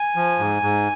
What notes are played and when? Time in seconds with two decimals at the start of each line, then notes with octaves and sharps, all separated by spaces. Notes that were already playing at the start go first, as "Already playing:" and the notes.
Already playing: G#5
0.16 F3
0.39 G#2
0.62 G#2